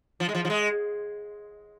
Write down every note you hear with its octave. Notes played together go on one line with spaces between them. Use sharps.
F3
G#3
F3
F3
G#3